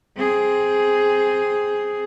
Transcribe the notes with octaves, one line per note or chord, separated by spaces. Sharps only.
C4 G#4